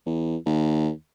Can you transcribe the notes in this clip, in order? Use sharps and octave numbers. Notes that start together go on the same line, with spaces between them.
E2
D#2